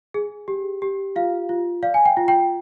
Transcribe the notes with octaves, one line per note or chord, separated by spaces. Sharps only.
G#4
G4
G4
F4 F5
F4
D5 F5
G#5
G5
F4
G5